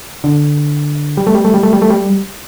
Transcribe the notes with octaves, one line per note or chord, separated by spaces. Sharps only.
D3
G3
A3
G3
A3
G3
A3
G3
A3
G3